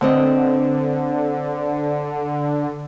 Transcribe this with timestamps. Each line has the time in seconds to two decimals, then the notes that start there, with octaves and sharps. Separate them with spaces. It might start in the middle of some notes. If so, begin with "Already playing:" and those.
0.01 D3 B3 C4 D#5